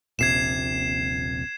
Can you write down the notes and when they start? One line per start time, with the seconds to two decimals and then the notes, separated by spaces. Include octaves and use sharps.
0.19 D#1 A#1 C3 G#6 C7 E7